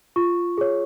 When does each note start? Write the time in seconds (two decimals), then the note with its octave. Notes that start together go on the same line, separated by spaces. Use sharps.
0.16 F4 C#6
0.58 G#4 C#5